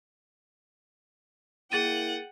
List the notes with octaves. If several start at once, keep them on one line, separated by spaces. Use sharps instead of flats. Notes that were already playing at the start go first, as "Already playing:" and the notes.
A#3 E4 G#4 F#5 G5 A6 D#7